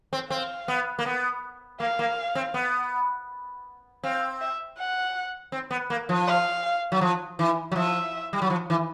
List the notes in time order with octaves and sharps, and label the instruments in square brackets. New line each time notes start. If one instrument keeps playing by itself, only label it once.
[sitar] C4
[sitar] C4 [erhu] F5
[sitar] B3
A#3
B3
[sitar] A#3 [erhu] F5
[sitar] A#3
C4
B3
[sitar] C4 [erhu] F5
[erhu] E5
F#5
[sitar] C4
B3
A#3
F3
[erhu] F5
[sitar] F#3
F3
E3
F#3
[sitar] F3 [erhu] E5
[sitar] G3
F#3
F3
E3